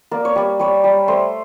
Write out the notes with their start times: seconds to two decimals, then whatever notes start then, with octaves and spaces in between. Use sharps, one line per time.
0.11 A#3 D5
0.25 C#5
0.36 G3 D5
0.59 G3 C#5
0.84 G3
1.08 A3 C5